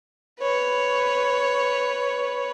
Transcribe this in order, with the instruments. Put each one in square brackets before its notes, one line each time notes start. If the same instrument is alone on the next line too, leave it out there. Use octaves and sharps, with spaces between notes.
[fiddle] B4 C#5